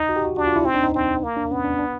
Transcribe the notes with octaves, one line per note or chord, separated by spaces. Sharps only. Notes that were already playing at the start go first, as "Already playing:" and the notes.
Already playing: D#4
F#4
G4
F#4
D4 F#4
F4
E4
C4 D#4
D4
D#4
C4
A#3
D4
B3 C#4
D4
D4